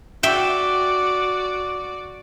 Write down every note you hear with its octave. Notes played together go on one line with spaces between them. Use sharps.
F#4 D5 E5 G5